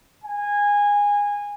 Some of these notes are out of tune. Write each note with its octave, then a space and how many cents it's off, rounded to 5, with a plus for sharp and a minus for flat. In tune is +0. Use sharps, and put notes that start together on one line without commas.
G#5 -20